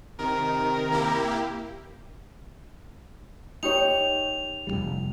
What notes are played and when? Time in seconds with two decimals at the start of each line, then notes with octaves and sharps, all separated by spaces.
0.19 C3 D#3 A#4
0.92 A#3 E4 G4
3.63 D#4 G4 C#5 F7
4.67 F1 C#2 G3